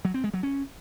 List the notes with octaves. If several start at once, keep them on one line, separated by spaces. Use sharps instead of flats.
F#3
C4
G#3
F#3
C#4